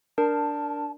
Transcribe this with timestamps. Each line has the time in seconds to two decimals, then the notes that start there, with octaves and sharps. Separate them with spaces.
0.18 D4 A#4 A5